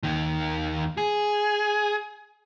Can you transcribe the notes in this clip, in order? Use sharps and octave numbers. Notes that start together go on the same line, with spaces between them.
D#2 D#3
G#4